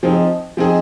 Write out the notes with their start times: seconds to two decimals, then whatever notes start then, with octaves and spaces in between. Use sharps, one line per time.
0.03 F3 C4 D#4 G#4
0.57 F3 C4 D#4 G#4